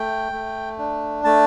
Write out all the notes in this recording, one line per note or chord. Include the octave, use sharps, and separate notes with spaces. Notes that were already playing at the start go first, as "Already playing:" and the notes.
Already playing: A3 G5
A3
D4
A3 A5